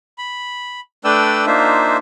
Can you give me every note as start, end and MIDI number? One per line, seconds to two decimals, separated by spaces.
0.18 0.80 83
1.04 1.46 57
1.04 1.46 62
1.04 1.46 71
1.04 1.46 74
1.04 1.46 79
1.04 1.46 88
1.47 1.97 58
1.47 1.97 62
1.47 1.97 63
1.47 1.97 65
1.47 1.97 72
1.47 1.97 76